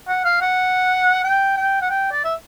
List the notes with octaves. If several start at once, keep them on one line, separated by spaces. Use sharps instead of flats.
F#5
F5
F#5
G5
G5
F#5
G5
D5
E5